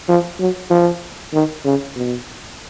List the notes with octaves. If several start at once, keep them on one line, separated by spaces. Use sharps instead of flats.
F3
F#3
F3
D#3
C#3
B2